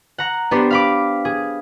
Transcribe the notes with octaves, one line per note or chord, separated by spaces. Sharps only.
F#5 A#5
B3 D4 G4 C5
F5 B5 D6
G#4